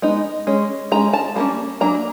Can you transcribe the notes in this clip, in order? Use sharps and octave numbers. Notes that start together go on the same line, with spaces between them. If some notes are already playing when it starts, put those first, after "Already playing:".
G#3 B3 D#4
G#3 C#4
G#3 C#4 A#5
A5
G3 A#3 C#4 A5
F#3 A#3 D4 A#5